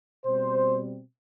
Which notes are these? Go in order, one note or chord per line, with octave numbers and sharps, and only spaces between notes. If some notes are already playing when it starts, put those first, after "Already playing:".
B2 G3 C4 C5